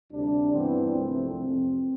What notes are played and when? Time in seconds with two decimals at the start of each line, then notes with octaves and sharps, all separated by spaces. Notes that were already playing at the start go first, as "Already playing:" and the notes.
0.12 D2 C3 G3 D4
0.51 G2 E3 G3 B3 C4
0.89 C2 C3 F3 A3 C4
1.29 F2 C3 F3 C4